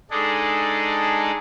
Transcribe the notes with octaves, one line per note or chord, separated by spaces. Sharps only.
G#3 D4 D#4 G#4 A4